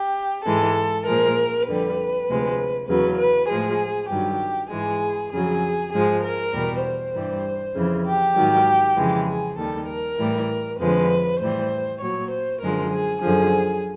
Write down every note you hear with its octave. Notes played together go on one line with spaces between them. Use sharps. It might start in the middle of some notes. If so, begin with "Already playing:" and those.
Already playing: G4
G#2 E3 G#3 A4
A#2 F3 G#3 A#4
F2 D3 G3 B4
D2 C3 F3 G#3
E2 C#3 F#3 B4
B4
A2 F3 G#3 G#4
G2 D#3 F#3 G4
G#2 E3 G#3 G#4
F2 C#3 F#3 G#4
G#2 F3 G#3 G#4
A#4
E2 B2 G3
C5
G2 E3 G3
F2 C#3 E3
G4
G#2 D#3 F#3
F2 C#3 E3 G#3
G#4
D#2 D#3 G3 A4
A#4
A2 E3 G3
F2 D3 F3 G#3 B4
A2 E3 G3 C5
A#2 F#3 C#5
C5
F#2 D3 F3 G#3 A#4
G#4
F#2 D3 F3 G#4